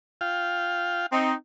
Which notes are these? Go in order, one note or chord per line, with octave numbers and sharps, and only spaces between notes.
F4 F5 G5
C4 D#4